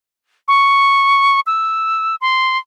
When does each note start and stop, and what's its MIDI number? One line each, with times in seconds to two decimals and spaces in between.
0.48 1.40 85
1.47 2.15 88
2.21 2.58 84